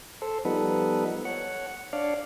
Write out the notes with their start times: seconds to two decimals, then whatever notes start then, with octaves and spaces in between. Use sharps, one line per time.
0.22 A4 C5
0.45 F3 G3 B3 D#4 A4 B4
1.25 C#5 F#5
1.93 D4 C#5 D5 F5